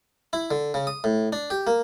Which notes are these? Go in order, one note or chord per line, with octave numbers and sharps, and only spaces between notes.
E4
D3
C#3
D#6
A2
D4
G4
A#3